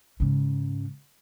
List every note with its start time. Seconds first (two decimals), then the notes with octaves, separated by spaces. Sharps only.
0.20 G#2 C#3